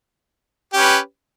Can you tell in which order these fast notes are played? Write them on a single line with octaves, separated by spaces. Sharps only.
G4 C#4 B4